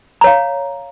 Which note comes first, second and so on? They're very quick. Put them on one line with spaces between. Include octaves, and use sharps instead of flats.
A#5 C#5 F5